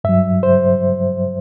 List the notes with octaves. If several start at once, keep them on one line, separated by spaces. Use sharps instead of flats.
G2 F#3 E5
C5